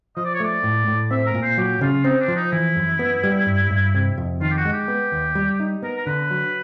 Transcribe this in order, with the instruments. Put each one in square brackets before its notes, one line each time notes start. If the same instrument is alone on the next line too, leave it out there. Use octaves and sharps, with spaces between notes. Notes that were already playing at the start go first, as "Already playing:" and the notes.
[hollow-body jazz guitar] F3 [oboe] D#5
[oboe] D5
C#5
[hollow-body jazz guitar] A3 [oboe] D5
[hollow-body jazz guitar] A2
A2
[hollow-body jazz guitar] C4 [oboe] E5
[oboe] A#4
[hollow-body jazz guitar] A#2
[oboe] C5
[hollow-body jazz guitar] F#3 [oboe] G4
[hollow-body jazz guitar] C#3 [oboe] F4
[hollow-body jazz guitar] C4 [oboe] D#4
[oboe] D4
[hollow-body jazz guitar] F3
[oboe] D#4
[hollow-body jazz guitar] E3 [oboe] E4
[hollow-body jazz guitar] F#2
B3
G3
G2
G2
C3
F2
[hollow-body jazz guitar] D#3 [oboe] F4
[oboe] G4
F#4
[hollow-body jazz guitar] G#3
[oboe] G4
[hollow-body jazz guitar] B3
D#2
G3
D#4
[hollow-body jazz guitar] B3 [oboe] A#4
[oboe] A#4
[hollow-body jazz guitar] D3 [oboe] B4
[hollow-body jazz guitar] F#3